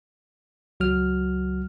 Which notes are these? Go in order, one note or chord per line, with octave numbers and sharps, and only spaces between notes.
C#2 F#3 F#4 F6